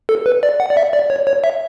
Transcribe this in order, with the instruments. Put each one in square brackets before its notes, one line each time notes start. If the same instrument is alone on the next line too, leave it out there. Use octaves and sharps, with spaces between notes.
[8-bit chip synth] A4
B4
D5
F#5
D5
E5
D5
C#5
C#5
E5